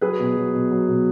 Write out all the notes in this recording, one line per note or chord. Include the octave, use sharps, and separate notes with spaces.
F#3 G#4 B4
B2
F#3
B2
F#3
B2